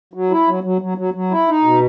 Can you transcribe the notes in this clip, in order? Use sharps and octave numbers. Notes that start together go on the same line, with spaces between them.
F#3
E4
F#3
F#3
F#3
F#3
F#3
E4
D#4
B2